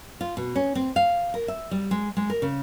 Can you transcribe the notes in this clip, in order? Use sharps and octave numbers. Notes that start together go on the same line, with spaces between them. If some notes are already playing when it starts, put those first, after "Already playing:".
F4
B2
C#4
C4
F5
A#4
E5
G3
G#3
G#3
A#4
C#3